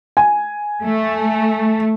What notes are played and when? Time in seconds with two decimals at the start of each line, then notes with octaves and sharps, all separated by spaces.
0.17 G#5
0.82 A3